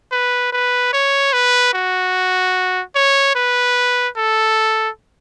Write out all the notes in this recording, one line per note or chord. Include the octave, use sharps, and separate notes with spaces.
B4
B4
C#5
B4
F#4
C#5
B4
A4